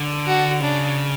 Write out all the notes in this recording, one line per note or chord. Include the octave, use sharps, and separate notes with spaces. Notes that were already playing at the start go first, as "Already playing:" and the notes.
Already playing: D3
F#4
C#3 D4